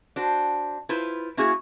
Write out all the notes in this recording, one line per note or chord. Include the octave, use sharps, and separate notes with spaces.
D4 F#4 C5
E4 F4 B4 C5
A#3 C#4 E4 F#4 G#4